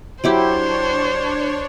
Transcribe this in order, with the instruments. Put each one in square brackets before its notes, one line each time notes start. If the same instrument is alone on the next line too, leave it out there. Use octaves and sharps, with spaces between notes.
[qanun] F#3 E4 G4 [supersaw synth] D4 C#5 [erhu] C5